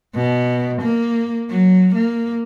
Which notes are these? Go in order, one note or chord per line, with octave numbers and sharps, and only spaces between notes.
B2
A#3
F#3
A#3